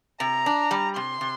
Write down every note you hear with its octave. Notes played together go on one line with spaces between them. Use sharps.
C3 A#5
D4
G3
C3 C6
C3